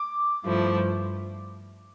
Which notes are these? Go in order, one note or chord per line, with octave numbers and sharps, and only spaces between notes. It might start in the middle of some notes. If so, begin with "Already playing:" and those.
Already playing: D6
G2 F3 A3 E4